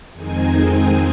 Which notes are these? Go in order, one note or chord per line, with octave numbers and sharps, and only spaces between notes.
F2 D#3 G#3 C4 D#4 G#5